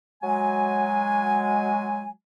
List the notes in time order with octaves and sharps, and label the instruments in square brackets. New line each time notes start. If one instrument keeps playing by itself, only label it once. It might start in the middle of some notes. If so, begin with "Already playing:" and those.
[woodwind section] F#3 G#3 G#5